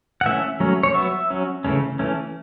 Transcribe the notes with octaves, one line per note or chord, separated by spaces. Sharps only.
F#5
E3 A3 C#4 E5
F#3 A3 C#4
C#5
F#3 B3 E5
F#3 C#4
C#3 E3 A3 C#4
E3 A3 C#4